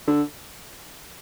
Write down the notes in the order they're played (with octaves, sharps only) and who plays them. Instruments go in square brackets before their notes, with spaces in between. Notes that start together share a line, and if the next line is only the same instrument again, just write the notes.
[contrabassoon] D3